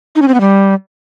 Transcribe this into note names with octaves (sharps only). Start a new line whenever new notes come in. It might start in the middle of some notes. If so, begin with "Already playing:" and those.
D#4
C#4
C4
B3
G3